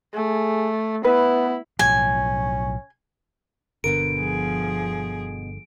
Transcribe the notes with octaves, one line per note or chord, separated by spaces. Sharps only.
A3 G#4
B3 E4 B4
B1 A2 F3 C#4 G#5
G1 B2 D3 B3 A#4 D7
F3 G#4